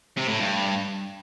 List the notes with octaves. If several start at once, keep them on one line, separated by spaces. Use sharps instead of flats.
C3
A2
G2